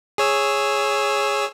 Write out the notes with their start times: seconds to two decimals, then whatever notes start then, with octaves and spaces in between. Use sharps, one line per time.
0.18 G#4 C#5 E6